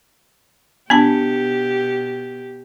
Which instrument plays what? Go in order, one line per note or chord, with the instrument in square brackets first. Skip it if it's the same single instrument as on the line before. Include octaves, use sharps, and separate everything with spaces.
[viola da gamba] B2 G4 [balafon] B3 D4 A5